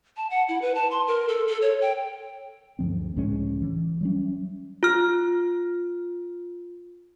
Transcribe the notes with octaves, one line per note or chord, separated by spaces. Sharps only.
A5
F#5
E4
B4
A5
C6
A#4
A4
A4
C#5
G5
D2 G2 F3 C4
C#2 A2 G#3 C#4
E3
F#3 G3 C#4
F4 F6